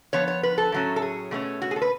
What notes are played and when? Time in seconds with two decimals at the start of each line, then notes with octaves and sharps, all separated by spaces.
0.13 F3 B3 C#5
0.28 C#5
0.43 B4
0.58 A4
0.72 A2 F#3 A3 C#4
0.96 A4
1.02 G#4
1.31 B2 A3 C#4
1.62 F#4
1.71 G#4
1.76 A4
1.82 B4